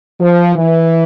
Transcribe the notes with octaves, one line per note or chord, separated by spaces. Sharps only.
F3
E3